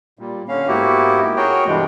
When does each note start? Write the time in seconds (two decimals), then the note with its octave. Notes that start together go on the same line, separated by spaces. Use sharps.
0.19 A#2 G3
0.48 D3 C#4 F5
0.67 G#2 A#3 B3 E4 F#4 G4
1.36 F#4 G#4 A#4 C#5 G5
1.66 G2 B2 E3 G3 G#3